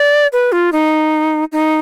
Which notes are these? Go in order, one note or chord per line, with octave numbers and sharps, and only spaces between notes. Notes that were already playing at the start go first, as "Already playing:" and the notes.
Already playing: D5
B4
F4
D#4
D#4